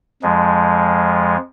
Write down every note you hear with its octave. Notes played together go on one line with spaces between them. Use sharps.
F2 F3 G#3